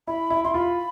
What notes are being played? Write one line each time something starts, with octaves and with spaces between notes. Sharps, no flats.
E4 B5
E4
E4 C6
F4 B5